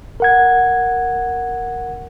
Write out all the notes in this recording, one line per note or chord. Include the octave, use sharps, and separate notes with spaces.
A#4 F#5 G#6